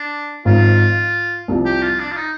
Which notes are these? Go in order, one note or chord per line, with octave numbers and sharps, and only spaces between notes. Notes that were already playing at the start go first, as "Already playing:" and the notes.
Already playing: D4
G#1 G#2 F3 F4
C2 C3 F3
G4
F4
D4
F4
D#4